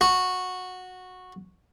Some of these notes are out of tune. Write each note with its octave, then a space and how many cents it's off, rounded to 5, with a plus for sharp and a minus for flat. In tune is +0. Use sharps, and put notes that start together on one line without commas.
F#4 -10